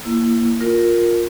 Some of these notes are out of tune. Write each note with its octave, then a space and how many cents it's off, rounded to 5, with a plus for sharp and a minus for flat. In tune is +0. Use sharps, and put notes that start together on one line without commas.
A#3 +0 E4 +25
F4 +15 A#4 +0